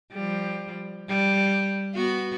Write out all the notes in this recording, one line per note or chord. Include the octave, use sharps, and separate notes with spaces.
F3 G3
G3
B3 F#4